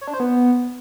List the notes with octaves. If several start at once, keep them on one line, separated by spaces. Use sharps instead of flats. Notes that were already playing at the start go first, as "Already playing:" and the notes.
C#5
D4
C5
B3